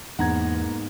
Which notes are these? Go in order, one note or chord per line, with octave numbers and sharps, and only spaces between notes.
E2 G#2 B2 A#3 B3 F#5 A#5 G#6